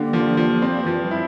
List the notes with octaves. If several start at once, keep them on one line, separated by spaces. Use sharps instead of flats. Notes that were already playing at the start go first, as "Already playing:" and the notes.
Already playing: D3 G3 A#3
F3
F3
G3 A#3 C4
E3
F3
E3 G3
E4